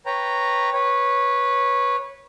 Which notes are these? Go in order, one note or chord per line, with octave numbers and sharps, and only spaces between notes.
B4 C#5 G5 A#5
B4 C#5